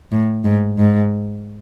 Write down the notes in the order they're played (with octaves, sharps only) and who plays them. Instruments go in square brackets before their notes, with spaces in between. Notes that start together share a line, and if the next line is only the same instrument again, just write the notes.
[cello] A2
G#2
G#2